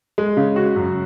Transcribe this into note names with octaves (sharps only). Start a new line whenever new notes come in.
G#3
C#3
F#4
F#2